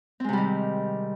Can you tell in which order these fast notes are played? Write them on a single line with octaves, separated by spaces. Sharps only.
C4 G#3 C3 G3 D#3